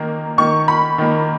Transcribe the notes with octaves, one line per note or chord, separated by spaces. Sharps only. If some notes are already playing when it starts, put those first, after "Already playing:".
Already playing: D#3 A#3 A#5
D#3 A#3 C#6
B5
D#3 A#3